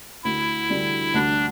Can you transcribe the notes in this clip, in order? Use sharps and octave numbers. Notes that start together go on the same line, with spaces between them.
D2 E4
D3 G3 D4 F#4
D2 D4